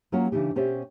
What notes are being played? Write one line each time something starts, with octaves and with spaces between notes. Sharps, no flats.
F#3 A#3 C#4 F4 F#4
C#3 E3 D4 D#4 G4
B2 C#4 G4 C5 D5 E5